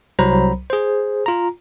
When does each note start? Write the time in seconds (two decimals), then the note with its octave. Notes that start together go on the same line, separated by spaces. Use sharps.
0.19 C2 F#3 C5 A#5 B5
0.70 G#4 C5
1.26 F4 A#5